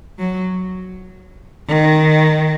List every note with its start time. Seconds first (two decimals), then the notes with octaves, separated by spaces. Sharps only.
0.18 F#3
1.68 D#3